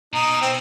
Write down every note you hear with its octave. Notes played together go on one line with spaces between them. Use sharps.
B2 D#4
C4